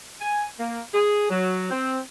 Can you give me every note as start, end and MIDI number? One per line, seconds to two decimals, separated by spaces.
0.20 0.45 80
0.59 0.80 58
0.94 1.27 68
1.29 1.71 54
1.71 1.98 60